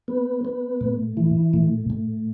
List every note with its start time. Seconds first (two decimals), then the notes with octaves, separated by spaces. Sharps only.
0.08 B3
0.45 B3
0.81 A2
1.17 E3
1.54 A2
1.90 A2